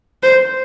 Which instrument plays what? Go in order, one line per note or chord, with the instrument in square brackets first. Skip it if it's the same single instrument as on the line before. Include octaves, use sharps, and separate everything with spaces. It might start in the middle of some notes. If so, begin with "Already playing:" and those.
[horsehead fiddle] C5